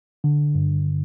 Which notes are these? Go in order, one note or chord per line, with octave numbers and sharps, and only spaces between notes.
D3
G2